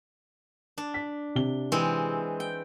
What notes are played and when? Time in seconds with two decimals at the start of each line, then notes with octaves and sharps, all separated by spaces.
0.78 D4
0.94 B6
1.35 C3 G7
1.72 E3 G#3 C4
2.40 G5